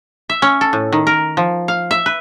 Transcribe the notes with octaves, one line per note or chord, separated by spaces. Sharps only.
E5
C#4
A4
A2
D#3
A#4
F3
F5
E5
B4